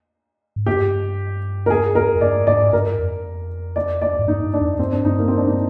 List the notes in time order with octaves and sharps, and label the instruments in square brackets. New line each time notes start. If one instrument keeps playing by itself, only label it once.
[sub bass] G#2
[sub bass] G2 [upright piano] G4
[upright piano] A#4
G#4
A#4
[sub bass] F2
[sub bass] G2 [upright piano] D5
[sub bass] G#2 [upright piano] D5
[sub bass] G2 [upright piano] A#4
[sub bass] F2
[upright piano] D5
D5
[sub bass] G#2
[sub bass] G2 [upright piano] D#4
[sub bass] G2
[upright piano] D4
[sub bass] F2
[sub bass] G2 [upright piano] C4
[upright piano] D4
[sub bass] G2 [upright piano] D#4
[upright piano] A#3
C4
D4
D#4